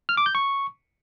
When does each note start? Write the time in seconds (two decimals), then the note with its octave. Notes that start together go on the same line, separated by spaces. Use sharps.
0.09 F6
0.17 D6
0.26 G6
0.35 C#6